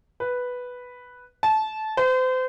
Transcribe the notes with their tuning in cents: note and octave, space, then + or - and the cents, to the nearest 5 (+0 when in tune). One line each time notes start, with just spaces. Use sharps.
B4 +0
A5 -20
C5 -35